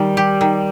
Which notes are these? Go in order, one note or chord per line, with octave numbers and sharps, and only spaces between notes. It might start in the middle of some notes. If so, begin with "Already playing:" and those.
Already playing: D#3 G3
G4
D#3